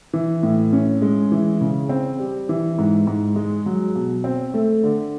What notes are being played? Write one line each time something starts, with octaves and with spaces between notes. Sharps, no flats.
E3
A2
C#4
G#3
E3
C#3
C4
G3
E3
G#2
G#2
G#3
F#3
B2
C4
A3
D3